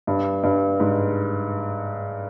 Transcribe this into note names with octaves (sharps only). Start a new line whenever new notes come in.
G2
G2
G#2